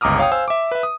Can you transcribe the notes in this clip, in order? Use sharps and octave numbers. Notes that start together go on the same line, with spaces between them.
G1 C#2 A#5 D6 D#6 F6
C#5 F5 G5 D#6
C5 F5 G#5 E6
E5 D6
B4 E5
D#6